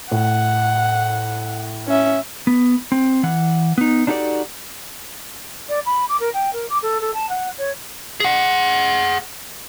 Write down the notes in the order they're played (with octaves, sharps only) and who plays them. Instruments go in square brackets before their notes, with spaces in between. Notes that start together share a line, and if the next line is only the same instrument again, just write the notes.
[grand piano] A2 [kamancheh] F#5
[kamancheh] C#4 E5
[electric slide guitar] B3
C4
E3 F#5
B3 D#4
D4 D#4 F#4 G4 A4 D5
[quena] D5
B5
D6
A#4
G5
A#4
D6
A4
A4
A5
F#5
C#5
[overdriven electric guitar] G#4 F#5